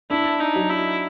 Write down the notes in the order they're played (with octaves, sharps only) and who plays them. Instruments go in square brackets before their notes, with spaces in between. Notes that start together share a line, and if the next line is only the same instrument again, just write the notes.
[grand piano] D4 [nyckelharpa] E4
[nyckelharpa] D#4
[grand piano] F#3
[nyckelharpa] E4